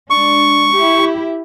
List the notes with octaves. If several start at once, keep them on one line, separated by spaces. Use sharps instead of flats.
G#3 D4 C#6
E4 G4